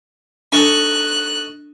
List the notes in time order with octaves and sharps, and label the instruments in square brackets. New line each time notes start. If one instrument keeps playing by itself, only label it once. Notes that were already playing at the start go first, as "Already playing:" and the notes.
[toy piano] D4 [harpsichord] D#4 A4 C#6 [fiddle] F#6